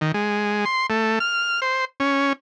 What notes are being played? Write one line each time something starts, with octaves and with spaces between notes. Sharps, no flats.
D#3
G#3
C6
A3
F6
C5
C#4